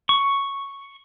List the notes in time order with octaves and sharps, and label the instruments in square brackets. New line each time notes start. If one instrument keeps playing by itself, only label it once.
[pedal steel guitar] C#6